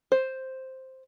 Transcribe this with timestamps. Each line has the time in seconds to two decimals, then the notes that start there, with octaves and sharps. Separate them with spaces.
0.12 C5